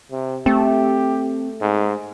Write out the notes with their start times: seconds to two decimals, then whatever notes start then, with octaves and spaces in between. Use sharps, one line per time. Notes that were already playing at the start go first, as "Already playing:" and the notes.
0.11 C3
0.46 A3 C4 G4
1.61 G#2